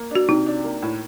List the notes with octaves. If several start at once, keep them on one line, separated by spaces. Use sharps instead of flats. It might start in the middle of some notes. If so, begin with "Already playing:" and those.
Already playing: A#3
D4 F#4
C3 D#4
D4
A#3
A2